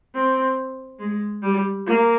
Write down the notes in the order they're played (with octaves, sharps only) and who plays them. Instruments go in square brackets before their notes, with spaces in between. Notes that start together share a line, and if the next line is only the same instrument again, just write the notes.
[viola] C4
G#3
G3
A#3